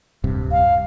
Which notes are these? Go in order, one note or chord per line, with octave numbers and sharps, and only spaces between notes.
D1 G2 C3
F5